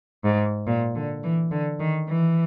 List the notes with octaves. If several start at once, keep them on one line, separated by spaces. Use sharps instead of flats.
G#2
A#2
D3
E3
D3
D#3
E3